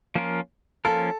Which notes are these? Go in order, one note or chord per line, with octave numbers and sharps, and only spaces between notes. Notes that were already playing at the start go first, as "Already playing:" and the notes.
F3 A#3 C#4 F4 A#4
F3 A#3 C#4 F4 A4 A#4